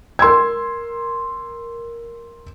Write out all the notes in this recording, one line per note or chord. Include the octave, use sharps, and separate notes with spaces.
A#4 C6 E6 G#6